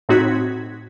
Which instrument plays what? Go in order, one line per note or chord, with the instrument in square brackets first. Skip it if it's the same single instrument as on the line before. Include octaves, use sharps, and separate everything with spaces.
[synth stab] A2 C4 D#4 F#4 G#6 B6